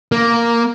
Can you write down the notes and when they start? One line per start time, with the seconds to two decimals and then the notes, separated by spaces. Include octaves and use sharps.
0.12 A#3